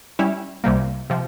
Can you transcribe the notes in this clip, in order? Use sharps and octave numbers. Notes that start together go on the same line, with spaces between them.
G3 C#4 E4
C2 C3 G3 A#3
C3 F3